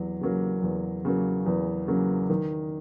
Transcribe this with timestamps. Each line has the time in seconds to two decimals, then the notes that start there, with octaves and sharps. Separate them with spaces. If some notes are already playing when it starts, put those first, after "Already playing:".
Already playing: E2 F#3
0.21 C#3 F#3 A#3
0.63 E2
1.05 C#3 F#3 A#3
1.46 E2
1.88 C#3 F#3 A#3
2.30 D#3